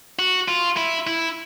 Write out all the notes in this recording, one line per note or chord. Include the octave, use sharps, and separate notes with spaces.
F#4
F4
E4
E4